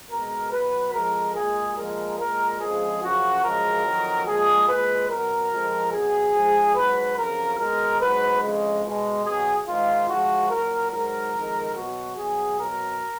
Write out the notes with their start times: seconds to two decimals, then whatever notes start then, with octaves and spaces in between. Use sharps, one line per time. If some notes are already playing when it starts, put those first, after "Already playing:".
0.10 B2 G#3 A#4
0.52 B2 F#3 B4
0.93 F2 F3 G#3 A#4
1.35 A#2 G#3 G#4
1.77 A#2 F3 G#3 A#4
2.18 A#2 G#3 A#4
2.60 F2 C#3 F3 G#3 G#4
3.02 F#2 C#3 F3 F#4
3.43 F#2 C#3 F3 G#3 A#4
3.84 F2 D#3 F#3
4.26 A#2 F3 G#3 G#4
4.68 A#2 G#3 B4
5.09 B2 F#3 A#4
5.52 F2 F3 G#3
5.92 B2 F#3 G#4
6.34 G#2 F3 G#3
6.76 G#2 F#3 B4
7.17 F2 C#3 F#3 A#4
7.59 B2 G#3 A#4
8.01 G#2 F#3 B4
8.42 F2 C#3 G#3
8.84 B2 G#3
9.25 B2 F#3 G#4
9.67 G#2 D#3 G#3 F4
10.09 G#2 F3 G#3 F#4
10.50 A#2 F#3 A#4
10.91 G#2 F#3 A#4
11.33 F2 D#3 G#3
11.75 B2 F#3 F#4
12.16 B2 F#3 G#4
12.58 B2 F#3 A#4